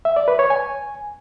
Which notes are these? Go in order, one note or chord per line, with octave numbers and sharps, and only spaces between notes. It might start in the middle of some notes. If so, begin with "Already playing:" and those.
E5
D5
B4
C#5
G#5